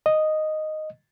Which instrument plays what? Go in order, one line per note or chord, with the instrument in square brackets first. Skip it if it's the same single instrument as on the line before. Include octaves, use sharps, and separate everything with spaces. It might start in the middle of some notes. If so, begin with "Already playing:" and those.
[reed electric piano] D#5